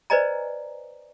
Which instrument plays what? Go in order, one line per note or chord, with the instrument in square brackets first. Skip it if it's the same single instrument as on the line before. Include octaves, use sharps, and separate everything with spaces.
[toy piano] B4 C5 D5 D#5 G#5 A#5